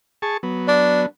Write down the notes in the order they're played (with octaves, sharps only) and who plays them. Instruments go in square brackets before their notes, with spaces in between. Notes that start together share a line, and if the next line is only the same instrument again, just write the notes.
[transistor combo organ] G#4 A5 C#6
F#3 B3
[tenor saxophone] D4